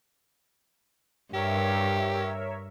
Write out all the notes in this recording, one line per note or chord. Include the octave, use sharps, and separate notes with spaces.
G2 G4 A#4 C#5 E5